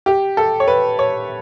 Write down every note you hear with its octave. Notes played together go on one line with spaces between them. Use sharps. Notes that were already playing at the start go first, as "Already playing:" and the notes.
G4
A4
C#5
B4
C#5